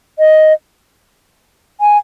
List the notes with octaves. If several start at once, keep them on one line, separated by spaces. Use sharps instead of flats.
D#5
G#5